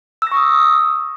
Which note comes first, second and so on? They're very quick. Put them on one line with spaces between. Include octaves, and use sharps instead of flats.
E6 A#6 C#6 D#6